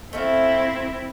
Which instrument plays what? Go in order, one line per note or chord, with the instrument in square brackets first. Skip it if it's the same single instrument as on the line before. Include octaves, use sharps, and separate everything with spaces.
[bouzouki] A3 E5 F5 [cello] C4 E4